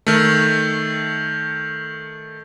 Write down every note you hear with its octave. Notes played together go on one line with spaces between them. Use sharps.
D#3 A3